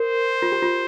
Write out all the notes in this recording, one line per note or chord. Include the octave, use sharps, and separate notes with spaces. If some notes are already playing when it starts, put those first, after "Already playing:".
Already playing: A#4 C5
F4
G4
F4